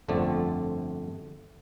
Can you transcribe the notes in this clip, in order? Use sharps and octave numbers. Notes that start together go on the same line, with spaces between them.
G1 F2 D3 A3 C4 D5